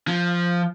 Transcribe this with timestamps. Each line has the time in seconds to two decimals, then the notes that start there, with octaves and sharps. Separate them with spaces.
0.08 F3